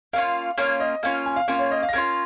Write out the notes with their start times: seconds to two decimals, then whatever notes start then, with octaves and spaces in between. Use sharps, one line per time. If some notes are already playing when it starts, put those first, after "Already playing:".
0.13 A#3 C#4 F4 F5
0.58 A#3 C#4 F4 C#5
0.80 D#5
1.03 A#3 C#4 F4 F5
1.26 G#5
1.36 F5
1.48 A#3 C#4 F4 F5
1.59 C#5
1.71 D#5
1.83 F5
1.89 A#6
1.93 A#3 C#4 F4 G#6